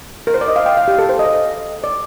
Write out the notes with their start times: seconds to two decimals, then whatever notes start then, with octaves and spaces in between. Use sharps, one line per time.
0.27 A#4
0.34 C5
0.41 D5
0.48 D#5
0.56 F5
0.66 G5
0.77 F5
0.88 G4
0.99 A4
1.09 C5
1.19 D#5
1.84 D5